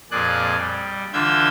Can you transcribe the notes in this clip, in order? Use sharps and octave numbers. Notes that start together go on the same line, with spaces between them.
F2 A#2 G#4 D5 F#6
G3
D3 E3 F4 E6 G6 G#6